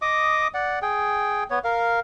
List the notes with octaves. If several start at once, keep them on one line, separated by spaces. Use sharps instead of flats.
D#5 D6 D#6
D5 F#5
G#4 G5
B3 C#5
A#4 F5